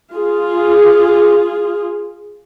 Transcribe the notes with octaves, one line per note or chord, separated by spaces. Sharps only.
F4 G#4